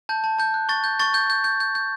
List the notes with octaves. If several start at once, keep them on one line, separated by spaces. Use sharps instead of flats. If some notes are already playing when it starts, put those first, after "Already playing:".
A5 G6
A5
A5 G6
F#6
C#6 A6
G6
C#6 A6
G6
G6
G6
G6
G6